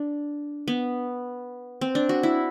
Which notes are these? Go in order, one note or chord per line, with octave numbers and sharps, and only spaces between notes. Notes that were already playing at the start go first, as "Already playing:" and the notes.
Already playing: D4
B3
C4
D4
F#4
E4